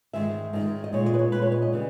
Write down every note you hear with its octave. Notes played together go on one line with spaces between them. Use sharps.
G#2 D#3 G#3 E5
G#2 D#3 G#3 D#5
D#5
A#2 G#3 C#5
D#5
B4
C#5
A#2 G#3 B4
C#5
D#5
D#5
C#3 E3 G3